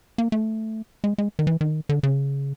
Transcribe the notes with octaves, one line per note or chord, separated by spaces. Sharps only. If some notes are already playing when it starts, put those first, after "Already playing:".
A#3
A3
G#3
G#3
D#3
E3
D#3
D3
C#3